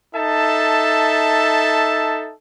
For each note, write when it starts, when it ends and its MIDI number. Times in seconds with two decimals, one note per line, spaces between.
0.15 2.33 63
0.15 2.33 69
0.15 2.33 76
0.15 2.33 81